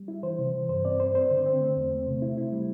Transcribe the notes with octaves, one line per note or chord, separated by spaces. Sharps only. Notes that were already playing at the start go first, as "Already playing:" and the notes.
Already playing: G3
E4
E3 C5
C3
E3
G2 C5
C4 D5
C4 C5
C4 C5
D3
C4
A3
E2
A3
C3
E4
E4
G3